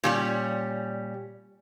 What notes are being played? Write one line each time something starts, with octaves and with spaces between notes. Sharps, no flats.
A#2 G3 C#4